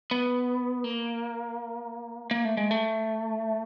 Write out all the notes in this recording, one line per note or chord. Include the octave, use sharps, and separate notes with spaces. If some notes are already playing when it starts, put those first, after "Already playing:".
B3
A#3
A#3
A3
G#3
A3